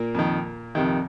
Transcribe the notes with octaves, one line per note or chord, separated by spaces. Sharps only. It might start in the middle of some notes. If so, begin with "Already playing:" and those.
Already playing: A#2 A#3
F2 D#3
F2 C3 D#3